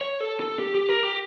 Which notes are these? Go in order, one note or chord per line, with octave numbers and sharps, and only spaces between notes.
C#5
A4
A4
G4
G4
A#4
G4